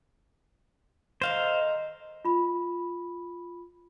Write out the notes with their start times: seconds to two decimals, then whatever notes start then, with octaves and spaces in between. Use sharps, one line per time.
1.22 D#3 D#4 A4 C5 F5
2.25 F4 B5